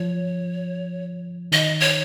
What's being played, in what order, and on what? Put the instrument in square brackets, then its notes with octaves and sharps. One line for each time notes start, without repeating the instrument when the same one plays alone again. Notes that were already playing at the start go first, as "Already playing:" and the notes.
Already playing: [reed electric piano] F3 [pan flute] C#5
[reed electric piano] D#3 [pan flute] D#5
[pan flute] C#5